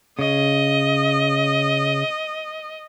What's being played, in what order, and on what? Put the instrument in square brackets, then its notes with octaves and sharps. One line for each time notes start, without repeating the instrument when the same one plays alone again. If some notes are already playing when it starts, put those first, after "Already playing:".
[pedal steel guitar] C#3 [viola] D#5